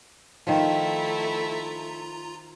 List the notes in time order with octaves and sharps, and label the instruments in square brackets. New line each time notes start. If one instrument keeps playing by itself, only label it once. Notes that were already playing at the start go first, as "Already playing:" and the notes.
[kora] D#3 F3 [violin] A3 E4 [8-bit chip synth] F4 A#5